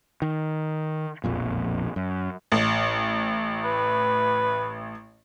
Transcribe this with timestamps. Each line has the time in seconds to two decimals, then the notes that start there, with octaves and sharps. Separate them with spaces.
0.22 D#3
1.24 E1 A#1 F2 A#2
1.96 F#2
2.52 A1
3.64 B4